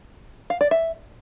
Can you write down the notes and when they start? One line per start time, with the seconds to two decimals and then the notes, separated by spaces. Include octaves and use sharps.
0.50 F5
0.61 D5
0.71 E5